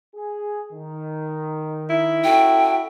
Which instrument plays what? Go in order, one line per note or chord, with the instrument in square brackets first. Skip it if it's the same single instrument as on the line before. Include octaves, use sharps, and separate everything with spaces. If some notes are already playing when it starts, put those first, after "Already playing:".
[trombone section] G#4
D#3 D#4
[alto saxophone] E4
[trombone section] C#4 F#4 A4 [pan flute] G5